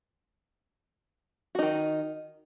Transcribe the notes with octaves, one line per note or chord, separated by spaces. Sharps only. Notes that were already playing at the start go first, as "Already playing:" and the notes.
D#3 D#4 F#4